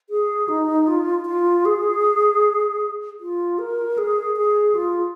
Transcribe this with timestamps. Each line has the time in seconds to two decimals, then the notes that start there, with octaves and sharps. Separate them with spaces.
0.10 G#4
0.48 D#4
0.87 F4
1.26 F4
1.65 G#4
3.20 F4
3.59 A#4
3.98 G#4
4.36 G#4
4.75 F4